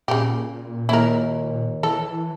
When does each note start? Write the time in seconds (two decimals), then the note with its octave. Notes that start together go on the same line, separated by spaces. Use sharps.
0.08 A#2 C#3 E3 G4
0.89 D#2 E4 A#4
1.83 E3 A4